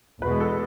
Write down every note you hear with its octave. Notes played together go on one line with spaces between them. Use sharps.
E2 B2 G#3 B4
A4